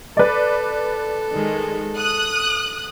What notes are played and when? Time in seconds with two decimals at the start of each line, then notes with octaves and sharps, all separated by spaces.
0.17 A4 B4 D5
1.30 D#3 G#3
1.97 D#6 F#6